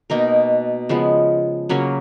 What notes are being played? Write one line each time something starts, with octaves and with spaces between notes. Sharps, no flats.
B2 A#3 D#4 A#4
C#3 F3 G#3 B3
C#3 F#3 A#3 C#4